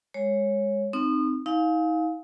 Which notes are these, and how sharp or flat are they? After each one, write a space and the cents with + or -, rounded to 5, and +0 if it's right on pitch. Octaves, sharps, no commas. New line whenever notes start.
G#3 -15 C#5 -10
C4 +0 D#4 -15 D#6 -30
D#4 +40 F5 +15 G#5 +15